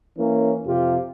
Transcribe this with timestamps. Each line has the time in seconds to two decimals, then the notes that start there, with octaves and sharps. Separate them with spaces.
0.18 E3 A#3 C#4
0.65 F2 C3 F4 G4